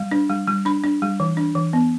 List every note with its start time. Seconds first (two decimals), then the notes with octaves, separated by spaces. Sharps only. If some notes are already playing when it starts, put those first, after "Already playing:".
Already playing: G3
0.11 D4
0.30 G3
0.48 G3
0.65 D4 B5
0.84 D4
1.02 G3
1.20 E3
1.37 D4
1.55 E3
1.73 B3